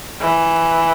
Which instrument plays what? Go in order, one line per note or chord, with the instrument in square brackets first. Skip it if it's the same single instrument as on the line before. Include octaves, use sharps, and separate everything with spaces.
[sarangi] E3